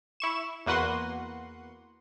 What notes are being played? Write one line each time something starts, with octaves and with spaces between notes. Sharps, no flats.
E4 C#6 E7
E2 A#3 F#4 B4 F#5 C6